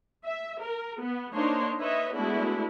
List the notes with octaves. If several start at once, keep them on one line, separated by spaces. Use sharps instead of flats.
E5
A#4
B3
A#3 D4 D#4 C5 C#5 C6
B4 C#5 D#5 E5
G#3 A3 B3 D4 E4 F#4